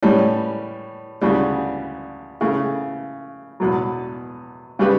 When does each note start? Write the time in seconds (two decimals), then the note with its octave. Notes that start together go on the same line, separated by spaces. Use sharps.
0.03 A2 E3 G3 C#4
1.21 D2 C#3 E3 G3
2.41 C#3 E3 A3
3.60 E2 B2 F#3
4.79 C#3 G3 D4 G4 B4